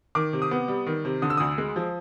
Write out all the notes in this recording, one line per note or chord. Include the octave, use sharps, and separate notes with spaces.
D#3 D6
C3
D#6
B3
G3
D#3
C3
D3 D#6
E6
D2 D#6
G#3
F3